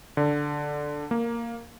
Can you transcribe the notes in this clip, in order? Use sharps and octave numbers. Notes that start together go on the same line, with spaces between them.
D3
A#3